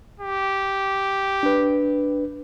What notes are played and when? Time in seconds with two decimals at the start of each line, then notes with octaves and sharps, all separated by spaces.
0.20 G4
1.43 D4 B4